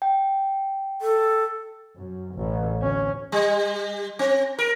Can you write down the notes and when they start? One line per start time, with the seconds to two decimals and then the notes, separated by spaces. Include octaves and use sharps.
0.02 G5
1.01 A4
1.96 F#2
2.35 A1
2.79 D2 C#4
3.32 G3
4.19 C4
4.59 A#4